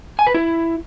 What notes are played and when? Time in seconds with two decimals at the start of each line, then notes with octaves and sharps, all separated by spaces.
0.19 G#5
0.27 B4
0.34 E4